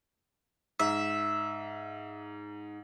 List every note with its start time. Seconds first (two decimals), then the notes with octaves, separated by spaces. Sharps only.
0.79 G#2 E5